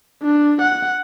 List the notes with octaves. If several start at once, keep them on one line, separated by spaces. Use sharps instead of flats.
D4
F#5